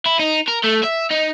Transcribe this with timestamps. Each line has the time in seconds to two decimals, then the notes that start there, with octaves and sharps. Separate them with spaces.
0.06 E4
0.19 D#4
0.48 A#4
0.64 A3
0.84 E5
1.11 D#4